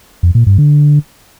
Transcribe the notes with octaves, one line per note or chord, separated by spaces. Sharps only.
F2
A#2
G2
D3